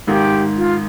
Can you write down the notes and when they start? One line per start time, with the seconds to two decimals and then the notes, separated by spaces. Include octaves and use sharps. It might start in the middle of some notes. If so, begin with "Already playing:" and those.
0.07 G#1 G#2 D#3 G4
0.57 F4